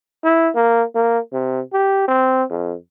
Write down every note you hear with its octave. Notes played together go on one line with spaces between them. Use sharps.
E4
A#3
A#3
C3
G4
C4
F2